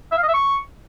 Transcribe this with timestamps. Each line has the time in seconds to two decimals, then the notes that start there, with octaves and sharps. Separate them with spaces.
0.12 E5
0.17 F5
0.23 D#5
0.28 E5
0.34 C#6